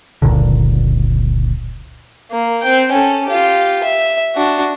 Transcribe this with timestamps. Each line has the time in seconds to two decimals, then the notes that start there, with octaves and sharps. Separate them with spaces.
0.22 F1 C#2 A#2 D3
2.31 A#3
2.63 C4 G5
2.91 C#4 A4
3.27 F4 G4
3.84 E5
4.35 D4 F#4